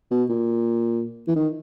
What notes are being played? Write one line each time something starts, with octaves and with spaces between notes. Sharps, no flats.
B2
A#2
E3
D#3